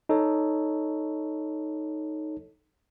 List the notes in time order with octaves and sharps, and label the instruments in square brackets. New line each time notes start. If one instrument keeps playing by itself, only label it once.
[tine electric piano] D#4 A4 C#5